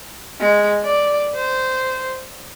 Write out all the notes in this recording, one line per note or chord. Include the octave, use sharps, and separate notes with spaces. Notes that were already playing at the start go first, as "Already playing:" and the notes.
G#3
D5
C5